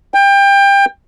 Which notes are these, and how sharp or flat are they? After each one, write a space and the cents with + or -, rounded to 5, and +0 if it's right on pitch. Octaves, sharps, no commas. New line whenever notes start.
G5 +25